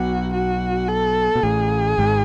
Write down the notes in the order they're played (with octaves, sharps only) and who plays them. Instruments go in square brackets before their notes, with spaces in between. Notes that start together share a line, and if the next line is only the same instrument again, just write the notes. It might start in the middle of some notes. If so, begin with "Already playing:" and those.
Already playing: [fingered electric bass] B1 B2 [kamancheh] F#4
[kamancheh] F#4
A4
[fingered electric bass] B2
[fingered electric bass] A1 A2 [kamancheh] G#4
[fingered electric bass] G#1 G#2